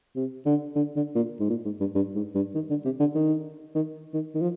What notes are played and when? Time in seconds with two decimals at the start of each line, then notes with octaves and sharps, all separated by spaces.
0.16 C3
0.46 D3
0.76 D3
0.96 D3
1.15 A#2
1.40 G#2
1.50 A#2
1.65 G#2
1.80 G2
1.95 G2
2.15 G#2
2.35 G2
2.54 D#3
2.70 D3
2.85 C3
3.00 D3
3.15 D#3
3.75 D#3
4.14 D#3
4.35 D#3
4.41 F3